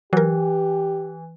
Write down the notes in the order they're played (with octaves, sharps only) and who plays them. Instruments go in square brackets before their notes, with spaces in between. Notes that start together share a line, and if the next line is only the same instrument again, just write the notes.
[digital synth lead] E3 [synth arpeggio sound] F#3 A#4 [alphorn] G4